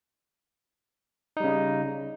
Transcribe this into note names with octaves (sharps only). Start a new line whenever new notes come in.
C#3 G3 D#4